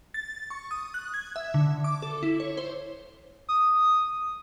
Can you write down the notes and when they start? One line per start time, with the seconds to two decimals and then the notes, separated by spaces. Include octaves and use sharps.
0.14 A6
0.50 C#6
0.71 D#6
0.94 F#6
1.14 G#6
1.36 E5
1.54 D3
1.84 D6
2.02 A4
2.23 E4
2.40 C#5
2.57 C5
3.49 D#6